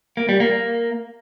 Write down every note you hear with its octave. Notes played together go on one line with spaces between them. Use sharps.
A#3
G3
A#3